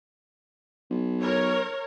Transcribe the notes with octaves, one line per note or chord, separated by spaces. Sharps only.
B1
A#4 C#5